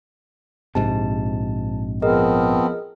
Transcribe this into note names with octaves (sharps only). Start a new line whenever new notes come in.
A#1 G#2 C3 A5
F3 B3 C4 G#4 A#4 D#5